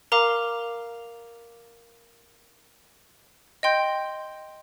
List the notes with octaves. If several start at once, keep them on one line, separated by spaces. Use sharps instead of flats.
A#4 F5 A#5 D6
D#5 G5 C6 G6